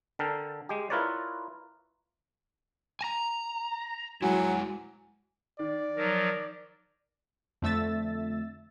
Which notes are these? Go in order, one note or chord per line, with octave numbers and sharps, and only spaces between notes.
D3 A4 A#4 G5
G#3 G4
E4 F4 A#4 B4 C#5 D5
G#5 A#5
F#3 G#3 E4 G#5
D#3 D5
F3 F#3 A#4
F2 D3 A3 E5 E6 A6